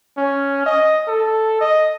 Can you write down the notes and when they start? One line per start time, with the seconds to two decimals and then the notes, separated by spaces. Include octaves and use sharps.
0.17 C#4
0.66 D#5
1.07 A4
1.61 D#5